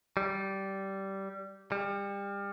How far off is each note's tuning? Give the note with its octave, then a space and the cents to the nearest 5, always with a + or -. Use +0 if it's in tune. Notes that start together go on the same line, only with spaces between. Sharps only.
G3 -15
G3 +30